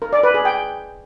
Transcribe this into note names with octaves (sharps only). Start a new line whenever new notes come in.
A#4
D5
B4
G#4
G5